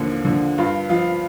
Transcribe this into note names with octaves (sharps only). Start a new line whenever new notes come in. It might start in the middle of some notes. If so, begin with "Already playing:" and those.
Already playing: D#2 D3 F3
D3 F3
G2 F4
F3 F4